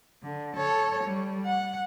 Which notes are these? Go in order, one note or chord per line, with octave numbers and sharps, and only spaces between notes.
D3
A4 C#5
G3
F#5